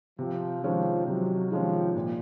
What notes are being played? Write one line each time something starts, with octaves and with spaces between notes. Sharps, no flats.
C3 F3
D#3 F3 G#3 C#4
C3 F#3
D#3 F3 G#3 C#4
A#2